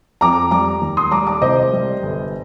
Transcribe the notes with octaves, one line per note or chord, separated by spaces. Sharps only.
F2 A#5 D6
G3 A#5 D6
D#2
C6 D#6
G3 A#5 D6
A#5 D6
C2 C5 D#5
G3
G1